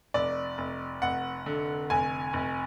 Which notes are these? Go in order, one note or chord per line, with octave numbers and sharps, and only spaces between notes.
F1 D5
F1
F1 F#5
D3
F1 G#5
F1